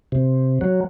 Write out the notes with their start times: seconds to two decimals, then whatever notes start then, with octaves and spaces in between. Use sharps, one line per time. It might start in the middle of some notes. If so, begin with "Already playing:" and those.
0.12 C3
0.61 F#3